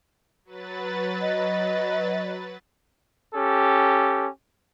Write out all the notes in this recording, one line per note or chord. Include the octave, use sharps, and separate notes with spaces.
F#3 B4 A6
D#5
C#4 G4 A4